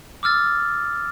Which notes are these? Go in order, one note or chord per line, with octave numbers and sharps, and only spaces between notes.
D6 E6 F6 A6